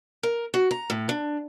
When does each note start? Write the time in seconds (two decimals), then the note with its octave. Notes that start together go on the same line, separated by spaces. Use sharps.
0.23 A#4
0.54 F#4
0.71 A#5
0.90 A2
1.09 D4